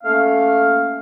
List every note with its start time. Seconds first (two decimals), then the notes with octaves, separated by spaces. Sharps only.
0.03 A3 A#3 C#4 F5